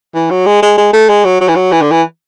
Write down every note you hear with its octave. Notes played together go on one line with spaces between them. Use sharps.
E3
F#3
G#3
G#3
G#3
A3
G#3
F#3
F#3
E3
F#3
E3
D3
E3